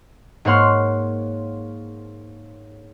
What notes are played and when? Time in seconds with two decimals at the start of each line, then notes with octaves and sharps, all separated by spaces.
0.45 G#2 A#3 C#5 F#5 C6 F6